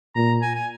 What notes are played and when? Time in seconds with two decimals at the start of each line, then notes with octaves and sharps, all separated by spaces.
0.15 A#2 A#5
0.42 G#5
0.55 G#5